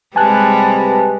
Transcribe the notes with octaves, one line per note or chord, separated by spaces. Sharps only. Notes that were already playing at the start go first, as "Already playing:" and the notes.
C3 G3 G#3 B4 G#5 A5 F#6